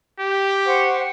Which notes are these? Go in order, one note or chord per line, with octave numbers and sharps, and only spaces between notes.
G4
C5 F#5 C#6